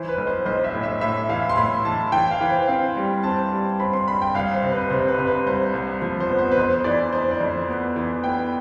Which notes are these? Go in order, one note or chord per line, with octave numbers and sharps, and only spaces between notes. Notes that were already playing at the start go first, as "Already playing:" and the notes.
Already playing: E3 C5
B4
B1
C5
B1 C5
E5
A2
E5
A2 E5
E3 F5
C6
A2 B5
E3 A5
E3 G5
F5
E3
C5
C4 F5
G3
C4 A5
G3
C4 B5
C6
G2 B5
G5
C2 F5
C5
C3
B4
C3 C5
B4
C3
B4
C2 C5
C2
F3
C5
B3
C5
B4
F2 C5
E3 D5
F2 C5
D5
F2
B3
E3
B3 G5